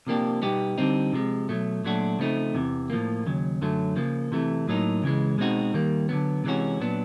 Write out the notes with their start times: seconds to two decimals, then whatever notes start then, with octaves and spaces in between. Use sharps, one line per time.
0.07 C3 F3 A#3 D4 G4
0.42 B2 G3 B3 D#4 G4
0.78 D3 G3 C4 D#4
1.13 C3 F3 G#3
1.49 B2 F#3 A3
1.85 A#2 F#3 A3 D4 F#4
2.19 C#3 F3 A3 C4 D#4
2.55 E2 C3 E3
2.90 A2 F3 A#3
3.26 D#2 C#3 F#3
3.61 F#2 D3 F#3 A3
3.96 C#3 F3 A#3
4.32 C3 E3 A3
4.68 A2 F#3 A#3 D#4
5.03 C#2 C#3 E3 G#3
5.38 B2 G#3 C4 D#4 F#4
5.74 D#2 D#3 G3 A#3
6.09 D3 F#3 B3
6.44 C3 E3 G#3 C#4 F#4
6.80 A#2 F#3 B3 D4